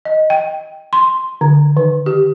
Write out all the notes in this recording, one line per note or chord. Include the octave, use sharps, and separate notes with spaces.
D#5
G5
C6
D3
D#3
G4